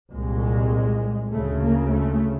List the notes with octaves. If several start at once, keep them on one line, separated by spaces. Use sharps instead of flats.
C2 A#2 G#3
D2 C#3 A3
A#3
A3